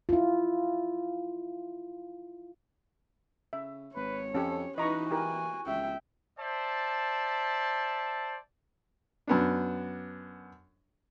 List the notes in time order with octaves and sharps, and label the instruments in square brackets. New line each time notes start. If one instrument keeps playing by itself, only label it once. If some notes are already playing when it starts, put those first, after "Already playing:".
[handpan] E4 F4
[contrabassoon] C#3 [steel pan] E5
[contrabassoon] G#1 [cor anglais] B4 [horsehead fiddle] C#5
[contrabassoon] F2 [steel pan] C#4 G4 [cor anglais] A4
[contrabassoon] E3 [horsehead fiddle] D#4 B4 [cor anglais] F#4 [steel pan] D#5 A#5 C#6
[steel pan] E4 G4 A#4 [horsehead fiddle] G#5
[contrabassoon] C#2 [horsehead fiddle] E5 G5
[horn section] C5 D5 E5 A5
[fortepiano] F#2 B3 D4